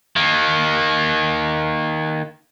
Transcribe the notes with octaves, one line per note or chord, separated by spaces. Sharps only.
D#3 A#3